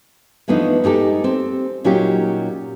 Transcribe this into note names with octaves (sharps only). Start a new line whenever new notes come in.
E3 F3 A3 B3 D4 D#4
G#3 D#4 G4 A4
C4
A#2 F#3 C#4 D#4 F4 G4